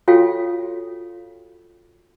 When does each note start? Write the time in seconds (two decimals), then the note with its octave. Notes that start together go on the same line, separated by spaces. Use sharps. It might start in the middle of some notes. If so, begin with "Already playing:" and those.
0.08 F4 F#4 A4 C#5 F5 G5